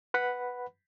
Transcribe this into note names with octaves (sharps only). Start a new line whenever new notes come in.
B4 F#5 B5